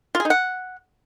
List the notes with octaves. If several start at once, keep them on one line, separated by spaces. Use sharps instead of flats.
F4
G#4
D#4
F#5